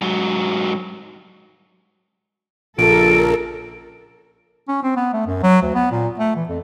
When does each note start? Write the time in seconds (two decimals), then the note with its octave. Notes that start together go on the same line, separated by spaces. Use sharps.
0.01 G#2 F#3
2.79 A#1 C#3 F4 A4 A#4 D7
4.68 C#4
4.83 C4
4.96 B3
5.13 A3
5.26 F#2
5.43 F#3
5.62 D2
5.75 B3
5.91 A#2
6.19 A3
6.36 E3
6.49 F2